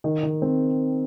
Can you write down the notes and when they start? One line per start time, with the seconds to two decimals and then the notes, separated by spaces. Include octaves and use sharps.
0.04 D#3
0.23 D#3
0.42 C4